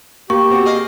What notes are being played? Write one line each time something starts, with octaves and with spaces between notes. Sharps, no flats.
A#3 G4 C#6
B2 C4 F#4
G#4 D#5 F5